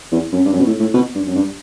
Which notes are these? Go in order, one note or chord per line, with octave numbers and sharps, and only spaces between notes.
E2
F#2
G2
F#2
B2
A2
A2
B2
G2
F#2
G2